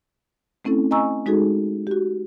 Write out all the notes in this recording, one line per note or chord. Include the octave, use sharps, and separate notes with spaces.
A3 C4 C#4 E4 A4
D#5 G#5 A#5 C#6 E6
G#3 D#4 F#4 G#4 A4
F#4 G4